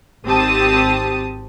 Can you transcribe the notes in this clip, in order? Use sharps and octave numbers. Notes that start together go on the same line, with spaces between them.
G#1 C4 G4 A5 D#6